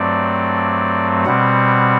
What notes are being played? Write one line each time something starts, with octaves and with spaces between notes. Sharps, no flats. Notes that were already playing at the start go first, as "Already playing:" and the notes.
Already playing: G2 F#3 A3 C4 D5
B2 G3 C4 F#5